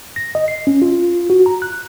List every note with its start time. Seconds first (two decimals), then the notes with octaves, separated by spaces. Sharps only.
0.16 A#6
0.35 D#5
0.48 C7
0.67 C#4
0.82 F4
1.30 F#4
1.46 A#5
1.62 F#6